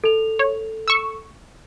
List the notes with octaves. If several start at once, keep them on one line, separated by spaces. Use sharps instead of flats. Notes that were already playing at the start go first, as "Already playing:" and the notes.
A4 F7
C#5
C#6 E6